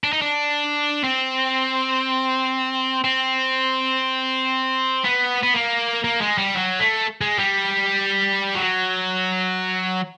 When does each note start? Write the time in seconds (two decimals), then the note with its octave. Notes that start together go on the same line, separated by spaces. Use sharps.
0.04 D4
0.13 D#4
0.22 D4
1.04 C4
3.04 C4
5.04 B3
5.43 B3
5.54 A#3
6.04 A#3
6.21 G#3
6.38 G3
6.54 F#3
6.80 A3
7.21 G#3
7.38 G3
8.55 F#3